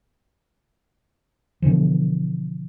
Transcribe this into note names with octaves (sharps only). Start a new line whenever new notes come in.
B2 D3 E3 F3